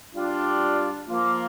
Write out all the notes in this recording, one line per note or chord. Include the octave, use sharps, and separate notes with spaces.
G3 D4 F4
F3 A#3 F4